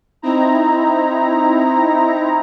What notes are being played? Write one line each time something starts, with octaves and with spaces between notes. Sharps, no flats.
C4 D#4 E4 A#5